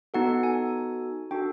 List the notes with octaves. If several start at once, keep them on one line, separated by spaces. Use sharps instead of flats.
B3 D#4 F#4 A4 F#5
G#5
D4 F#4 A4 G5